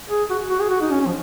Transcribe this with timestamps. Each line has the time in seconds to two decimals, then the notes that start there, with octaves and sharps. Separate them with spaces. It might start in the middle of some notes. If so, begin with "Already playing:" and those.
0.10 G#4
0.30 F#4
0.50 F#4
0.60 G#4
0.70 F#4
0.81 D#4
0.91 C#4
1.01 C#4
1.06 F3